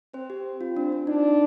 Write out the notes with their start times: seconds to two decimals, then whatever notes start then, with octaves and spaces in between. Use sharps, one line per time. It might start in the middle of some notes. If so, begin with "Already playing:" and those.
0.14 C4 C5
0.30 G4
0.61 F4
0.76 C4 D4
0.92 D4
1.07 D4 D#4